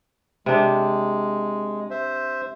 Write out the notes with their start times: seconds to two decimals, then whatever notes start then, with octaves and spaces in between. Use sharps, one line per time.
0.46 C3 G#3 D4
1.90 C5 E5